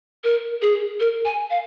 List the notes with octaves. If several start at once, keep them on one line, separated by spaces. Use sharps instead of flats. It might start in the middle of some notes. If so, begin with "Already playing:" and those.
A#4
G#4
A#4
G#5
F5